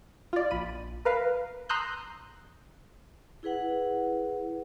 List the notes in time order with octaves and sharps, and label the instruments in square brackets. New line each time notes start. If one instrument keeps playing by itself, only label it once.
[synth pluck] F4 D5
A#1 B5 D#7
A#4 B4 F5
A#5 C6 D#6 E6 F#6 G6
[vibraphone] E4 G#4 B4 F#5